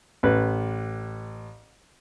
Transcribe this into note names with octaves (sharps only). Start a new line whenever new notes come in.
A1 B4